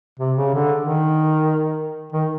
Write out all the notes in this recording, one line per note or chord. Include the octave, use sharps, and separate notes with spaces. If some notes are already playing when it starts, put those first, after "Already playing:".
C3
C#3
D3
D#3
D#3